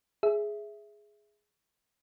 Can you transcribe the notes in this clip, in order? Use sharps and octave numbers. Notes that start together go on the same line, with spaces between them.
G#4 E5